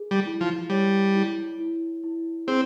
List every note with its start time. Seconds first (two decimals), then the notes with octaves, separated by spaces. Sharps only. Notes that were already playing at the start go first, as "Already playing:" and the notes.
Already playing: G#4
0.11 G3
0.26 E4
0.41 F3
0.70 G3 C#5
1.15 E4
1.59 E4
2.03 E4
2.47 C4 G#4